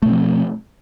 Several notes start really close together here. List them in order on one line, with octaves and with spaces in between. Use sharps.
A3 B2 C4 F3